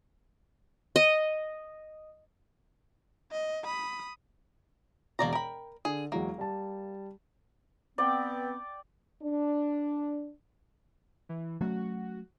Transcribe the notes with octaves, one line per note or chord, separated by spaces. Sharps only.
D#5
D#5
B5 D#6
E1 B2 A#3 D5 A#5
A#4 G5 B5
D3 G#4
E2 F#3 G#3 A#3
G3 A5
B3 C4 D5 G5
D4
E3
F#3 A3 C#4 F#4